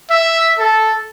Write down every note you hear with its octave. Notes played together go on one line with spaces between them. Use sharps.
E5
A4